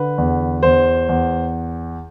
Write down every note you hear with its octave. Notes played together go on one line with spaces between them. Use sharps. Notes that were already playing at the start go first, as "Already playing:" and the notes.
Already playing: D3 B4
E2
E2 C5
E2